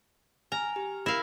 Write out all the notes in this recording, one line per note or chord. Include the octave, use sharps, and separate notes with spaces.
G#5 A#5 F6
G4
E4 A#4 F5 A#6